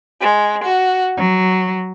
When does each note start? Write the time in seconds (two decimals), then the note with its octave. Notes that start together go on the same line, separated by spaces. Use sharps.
0.22 G#3
0.64 F#4
1.17 F#3